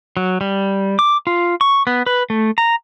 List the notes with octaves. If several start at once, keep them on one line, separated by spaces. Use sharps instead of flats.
F#3
G3
D6
F4
C#6
B3
B4
A3
A#5